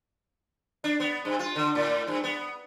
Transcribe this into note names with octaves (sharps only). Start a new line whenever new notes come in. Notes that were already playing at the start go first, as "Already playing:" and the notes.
D4
B3
G2
F4
D3
A2
G2
B3